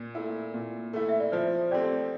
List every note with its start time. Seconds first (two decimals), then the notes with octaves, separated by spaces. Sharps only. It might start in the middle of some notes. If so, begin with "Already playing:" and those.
Already playing: A#2
0.15 A3 E4
0.54 A#2
0.93 A3 E4
1.09 E5
1.20 D5
1.32 F3 C5
1.71 A3 C4 G4 D5